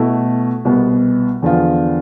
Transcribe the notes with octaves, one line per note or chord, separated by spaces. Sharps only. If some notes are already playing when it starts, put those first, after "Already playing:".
Already playing: B2 A3 E4
C2 B2 B3
E2 D3 F3 B3 F4